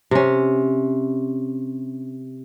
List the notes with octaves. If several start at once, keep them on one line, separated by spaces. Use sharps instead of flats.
C3 C#4